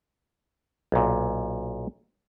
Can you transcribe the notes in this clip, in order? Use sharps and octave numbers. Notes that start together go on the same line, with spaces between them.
B1 A#2